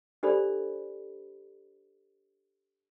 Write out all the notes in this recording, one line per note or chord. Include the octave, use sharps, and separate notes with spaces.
D4 G4 A4 C5 D5 B5